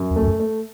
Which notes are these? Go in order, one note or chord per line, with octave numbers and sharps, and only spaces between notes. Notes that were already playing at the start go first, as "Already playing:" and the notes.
Already playing: F#2
E2
A3
E2
F#2
A3